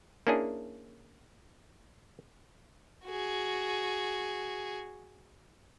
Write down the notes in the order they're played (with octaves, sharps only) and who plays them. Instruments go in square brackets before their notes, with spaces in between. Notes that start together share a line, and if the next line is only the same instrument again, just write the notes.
[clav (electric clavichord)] A#3 C#4 D4 E4 G#4
[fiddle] F#4 G#4